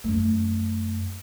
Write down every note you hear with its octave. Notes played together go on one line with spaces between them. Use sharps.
F#2 A3